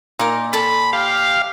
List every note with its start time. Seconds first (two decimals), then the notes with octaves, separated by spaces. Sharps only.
0.19 A#2 D#4 A#4
0.53 A4 A5 B5
0.93 G4 F5